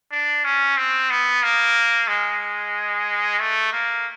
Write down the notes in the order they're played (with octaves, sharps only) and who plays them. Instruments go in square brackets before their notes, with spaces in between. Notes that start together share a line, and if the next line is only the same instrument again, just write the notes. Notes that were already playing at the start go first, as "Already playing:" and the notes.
[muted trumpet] D4
C#4
C4
B3
A#3
G#3
A3
A#3